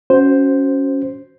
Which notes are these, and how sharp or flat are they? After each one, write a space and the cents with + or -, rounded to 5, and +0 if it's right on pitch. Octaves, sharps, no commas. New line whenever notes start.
C#4 +0 F#4 +0 C5 +0